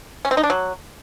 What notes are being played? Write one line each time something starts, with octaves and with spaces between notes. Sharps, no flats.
C#4
C4
D#4
D4
F#3